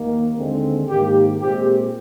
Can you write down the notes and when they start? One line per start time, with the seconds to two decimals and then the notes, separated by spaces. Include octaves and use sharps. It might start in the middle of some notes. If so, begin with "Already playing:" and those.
Already playing: D#2 D#3 A#3
0.36 D#2 D3 G#3 C4
0.88 G#2 D#3 A#3 G4
1.39 A#2 G#3 C4 G4